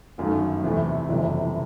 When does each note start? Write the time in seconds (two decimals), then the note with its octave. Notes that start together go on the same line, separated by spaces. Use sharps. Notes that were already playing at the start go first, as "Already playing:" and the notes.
0.18 G1 F#2 D#3 F#3 A3
0.64 E2 C3 E3 A3
1.09 F#1 F2 C3 E3 G3